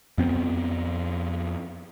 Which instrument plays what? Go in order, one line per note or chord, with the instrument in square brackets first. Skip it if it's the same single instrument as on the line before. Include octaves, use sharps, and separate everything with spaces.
[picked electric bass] F2 B3 C4